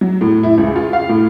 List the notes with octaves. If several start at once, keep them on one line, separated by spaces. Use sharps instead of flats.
F#3
A2
E4
C#2
F4
F5
A2